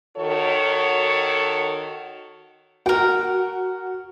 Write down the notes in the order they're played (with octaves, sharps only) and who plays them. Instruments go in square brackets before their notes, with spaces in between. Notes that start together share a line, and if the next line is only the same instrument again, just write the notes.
[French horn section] D#3 F#4 A4 C#5
[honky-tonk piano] F#4 [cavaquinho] A#4 G5